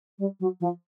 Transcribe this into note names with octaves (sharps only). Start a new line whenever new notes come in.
G3
F#3
F3